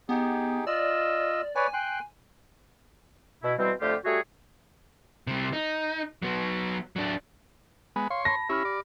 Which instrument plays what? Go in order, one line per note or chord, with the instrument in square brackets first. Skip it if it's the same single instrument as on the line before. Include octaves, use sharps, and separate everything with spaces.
[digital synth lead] B3 [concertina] D#4 G4 G#4
[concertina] F4 D#5 E6 [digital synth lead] D5
[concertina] B4 C#5 D5 [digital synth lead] G#5
[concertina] G5 C6 F#6
[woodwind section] B2 E4
B2 E3 G3 C4
F2 D3 A3 F4 G4
G3 A3 F#4 G#4 C#5
[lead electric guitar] C3 G3
D#4
F#3 B3
F#3 D4
[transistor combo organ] G#3 B3
[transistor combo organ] C#5 C6 [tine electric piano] F5
[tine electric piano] A5 B5 [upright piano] A#6
[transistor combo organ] C#4 E4 [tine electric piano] G4 B5 F6
[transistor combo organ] D5